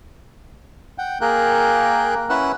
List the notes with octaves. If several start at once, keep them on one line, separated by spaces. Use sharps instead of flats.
F#5 G5
A#3 G#4 A#4 G5 F#6
C#4 E4 B4 F#5 E6 F#6